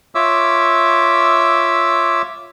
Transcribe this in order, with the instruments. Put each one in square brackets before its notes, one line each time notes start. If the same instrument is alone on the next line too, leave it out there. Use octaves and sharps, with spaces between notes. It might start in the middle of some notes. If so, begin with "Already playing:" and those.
[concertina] F4 C#5 E5 D6 E6